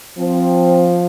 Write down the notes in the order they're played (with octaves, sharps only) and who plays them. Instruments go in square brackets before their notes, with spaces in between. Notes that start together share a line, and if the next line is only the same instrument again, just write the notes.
[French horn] F3 [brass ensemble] C4